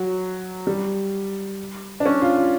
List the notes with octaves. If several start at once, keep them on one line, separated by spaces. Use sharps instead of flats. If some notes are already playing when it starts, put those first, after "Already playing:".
Already playing: F#3
G3
D4
C#4
F4
F4